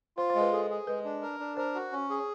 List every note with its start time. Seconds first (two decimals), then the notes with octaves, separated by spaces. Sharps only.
0.17 F4 C5
0.30 C5
0.35 G#3
0.41 B4
0.52 G#4 A4
0.70 G#4
0.87 G#3 B4
1.04 D4
1.22 A#4
1.40 D4
1.57 A#4 C5
1.75 F#4
1.92 C#4
2.10 G#4